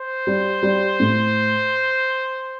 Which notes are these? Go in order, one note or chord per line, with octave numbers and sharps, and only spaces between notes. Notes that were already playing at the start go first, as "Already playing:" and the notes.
Already playing: C5
G3
G3
A2